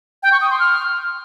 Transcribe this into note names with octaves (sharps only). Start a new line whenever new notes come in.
G5
C#6
D#6
C6
F6